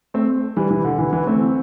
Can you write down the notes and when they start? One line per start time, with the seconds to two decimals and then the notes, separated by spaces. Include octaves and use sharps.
0.14 A3 C4
0.56 E3 G3
0.71 E3
0.85 D3
0.98 E3
1.13 E3
1.27 A3 C4